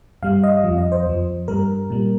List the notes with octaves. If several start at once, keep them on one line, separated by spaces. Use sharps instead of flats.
G2 G3 F5
D#5
F2 F3
D#5
C5
F2 F3
G2 G3 A#4
A#2 G3